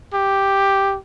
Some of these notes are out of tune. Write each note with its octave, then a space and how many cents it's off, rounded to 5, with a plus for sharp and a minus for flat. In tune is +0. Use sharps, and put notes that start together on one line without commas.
G4 +0